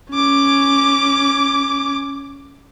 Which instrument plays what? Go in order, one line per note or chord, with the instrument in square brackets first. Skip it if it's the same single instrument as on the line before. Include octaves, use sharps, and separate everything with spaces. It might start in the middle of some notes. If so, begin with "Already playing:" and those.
[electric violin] C#4 D6